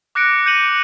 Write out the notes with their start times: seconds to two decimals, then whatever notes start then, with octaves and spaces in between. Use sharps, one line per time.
0.15 D6 F#6 A#6 C#7 D7
0.46 G6 C#7 D#7 F#7